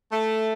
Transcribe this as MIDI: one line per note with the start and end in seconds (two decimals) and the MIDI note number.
0.11 0.53 57